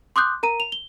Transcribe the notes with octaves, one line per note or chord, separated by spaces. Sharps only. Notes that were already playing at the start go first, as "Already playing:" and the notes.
C6 D6 D#6 F#6 G6
A#4 A#5 D#7
F7
G7